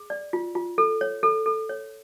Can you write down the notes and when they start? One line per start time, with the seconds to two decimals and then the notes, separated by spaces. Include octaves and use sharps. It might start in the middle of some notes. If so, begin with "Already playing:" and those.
Already playing: G#4
0.10 D5
0.33 F4
0.55 F4
0.78 A4
1.01 C#5
1.23 A4
1.46 A4
1.69 C#5